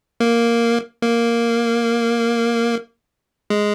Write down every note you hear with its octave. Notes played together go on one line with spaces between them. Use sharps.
A#3
A#3
G#3